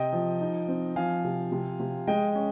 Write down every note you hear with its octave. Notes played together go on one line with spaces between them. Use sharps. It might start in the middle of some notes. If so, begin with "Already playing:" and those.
Already playing: C3 D#5 G5
F3
D#4
C4
F3 F5 G#5
C3
C3
C3
G#3 D#5 G5
C#4